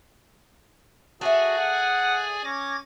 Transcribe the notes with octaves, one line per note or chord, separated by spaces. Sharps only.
F#4 G#4 A4 D5 E5 G#5
F#5
C#4 D6 G#6 A#6